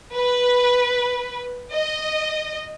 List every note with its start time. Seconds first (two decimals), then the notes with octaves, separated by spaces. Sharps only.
0.14 B4
1.73 D#5